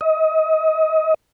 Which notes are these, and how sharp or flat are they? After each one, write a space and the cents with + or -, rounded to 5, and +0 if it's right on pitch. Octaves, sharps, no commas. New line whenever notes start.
D#5 +30